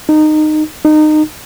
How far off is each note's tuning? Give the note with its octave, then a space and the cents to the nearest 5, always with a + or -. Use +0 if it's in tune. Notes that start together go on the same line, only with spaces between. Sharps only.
D#4 -20
D#4 -25